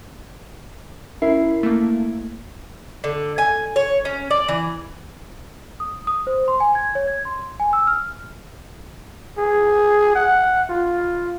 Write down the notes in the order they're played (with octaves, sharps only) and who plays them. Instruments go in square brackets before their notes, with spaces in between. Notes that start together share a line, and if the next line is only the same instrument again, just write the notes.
[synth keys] C#4 A#4 C7 [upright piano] E4
[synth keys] A3 A#3
[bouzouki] D3
G#5
C#5
C#4
D5
E3
[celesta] D#6
D#6
C5
C6
G#5
G#6
C#5
G#6
C6
G#5
E6
F6
[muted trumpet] G#4
F#5
F4